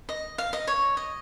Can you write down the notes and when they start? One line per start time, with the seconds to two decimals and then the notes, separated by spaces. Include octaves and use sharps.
0.09 D#5
0.38 F5
0.53 D#5
0.67 C#5
0.97 D#5